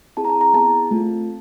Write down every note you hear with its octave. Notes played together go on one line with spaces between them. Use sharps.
C4 E4 G#4 A5
A#5
A5
A#5
B3 E4 G#4 A5
A3 C4 F4